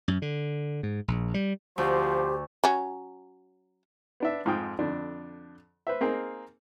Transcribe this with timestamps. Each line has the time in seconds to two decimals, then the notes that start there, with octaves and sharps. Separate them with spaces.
0.08 F#2
0.22 D3
0.83 G#2
1.08 A#1
1.34 G3
1.78 D2 F3 G4 C5
2.64 F#3 C#4
4.20 B3 D4 E5
4.45 F2 G#2 F3 F4 G5 D#6
4.79 F2 D3 D4
5.87 B4 C5 E5
6.01 A#3 C4 D#4 G#4 A#4